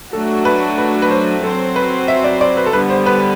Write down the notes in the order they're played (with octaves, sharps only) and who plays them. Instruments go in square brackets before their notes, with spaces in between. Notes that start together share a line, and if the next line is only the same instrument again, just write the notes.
[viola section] F#3 A3 D4 F#4 [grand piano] A4
[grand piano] B4
B4
B4
C5
[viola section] F#3 C4 F#4 C5 [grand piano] A4
[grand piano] B4
E5
D5
D5
B4
A4
[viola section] D3 G3 B3 [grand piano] B4
[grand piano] C5
B4